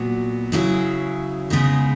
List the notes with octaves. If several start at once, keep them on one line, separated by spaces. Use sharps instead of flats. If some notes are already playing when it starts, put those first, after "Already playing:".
Already playing: A#2 F#3 B3 F#4
C#3 F#3 C#4 E4 G#4
C#3 G#3 B3 D#4 G#4